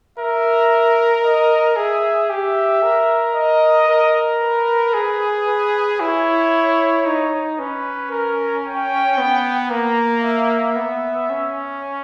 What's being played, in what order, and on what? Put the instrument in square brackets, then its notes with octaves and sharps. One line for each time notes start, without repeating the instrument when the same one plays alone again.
[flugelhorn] A#4 [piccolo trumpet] E5
[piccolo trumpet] D#5
[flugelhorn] G#4 [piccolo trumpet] E5
[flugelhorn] G4 [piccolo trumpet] E5
[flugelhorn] A#4
[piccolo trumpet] D#5
[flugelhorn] A#4
[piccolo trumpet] B4
[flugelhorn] G#4
[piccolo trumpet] B4
[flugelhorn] E4 [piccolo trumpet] C#5
[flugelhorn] D#4
[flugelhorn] C#4 [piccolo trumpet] B4
[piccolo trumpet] A#4
G5
[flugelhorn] B3
[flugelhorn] A#3 [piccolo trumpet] A#5
[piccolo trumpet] E5
[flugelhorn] B3
C#4